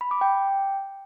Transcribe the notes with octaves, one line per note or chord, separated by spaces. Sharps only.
B5
D6
G5